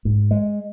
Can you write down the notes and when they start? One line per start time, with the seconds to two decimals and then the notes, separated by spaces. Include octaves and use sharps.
0.05 G#2
0.31 G#3